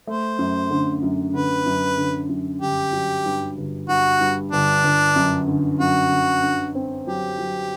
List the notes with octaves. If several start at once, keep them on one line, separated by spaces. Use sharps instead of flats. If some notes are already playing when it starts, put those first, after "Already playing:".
A3 C5
F#2
D3
F#2
D3 B4
F#2
D3
F#2
G1 G4
F#3
G2
G1
G2 F#4
G2
G1 D4
G1
F#2
D3
F#2 F#4
D3
D3
C4
F#3 G4
F#3